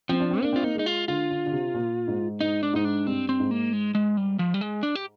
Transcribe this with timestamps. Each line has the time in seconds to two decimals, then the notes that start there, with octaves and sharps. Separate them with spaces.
0.09 F3 C4
0.20 D4
0.31 C4
0.42 A#3 D4
0.53 C4 F4
0.62 A#3 D#4
0.75 G#3 D#4
0.86 F4
1.08 D3 F4
1.30 D3
1.46 D3
1.52 C3
1.74 A#2
2.08 G#2
2.40 G#2 D#4
2.63 D4
2.74 G#2 D#4
2.85 D4
3.07 G2 C4
3.29 C4
3.40 G#2
3.51 A#3
3.73 G#3
3.95 G#3
4.17 G3
4.39 F3
4.54 G3
4.61 G#3
4.83 D4
4.95 G4